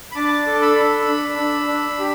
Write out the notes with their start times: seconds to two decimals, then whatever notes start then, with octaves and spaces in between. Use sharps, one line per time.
0.11 B5
0.16 D4 A5 D6
0.47 A4
0.62 B5 E6
0.77 D4
1.07 D4
1.38 D4
1.68 D4
1.99 G4